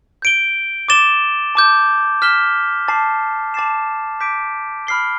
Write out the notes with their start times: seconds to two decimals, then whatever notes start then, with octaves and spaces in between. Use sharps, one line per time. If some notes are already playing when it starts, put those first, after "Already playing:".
0.22 G6 D7 G7
0.88 D6 A6 E7 G7
1.55 A5 D6 G6
2.22 F6 B6 E7 G7
2.88 A5 D6 A6 C7
3.54 A5 D6 A6 C7 E7
4.20 D6 G6 B6 D7
4.87 B5 F6 C7 G7